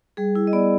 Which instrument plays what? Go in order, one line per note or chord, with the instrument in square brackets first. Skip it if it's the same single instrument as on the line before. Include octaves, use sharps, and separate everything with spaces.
[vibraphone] G3 G#4
E4
D#5
B3 D5